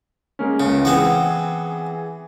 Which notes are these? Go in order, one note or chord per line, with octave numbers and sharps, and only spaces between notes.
G#3 A#3 C#4
C#2 C#3
E3 B3 C4 G#4